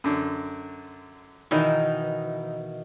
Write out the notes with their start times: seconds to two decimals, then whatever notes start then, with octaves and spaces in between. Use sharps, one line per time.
0.04 F#2 D3
1.51 B2 D#3 E3 D#4 E4